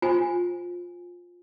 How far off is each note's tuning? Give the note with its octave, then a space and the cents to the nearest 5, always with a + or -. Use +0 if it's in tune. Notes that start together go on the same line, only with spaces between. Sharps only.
F4 +15 C5 +0 G#5 -10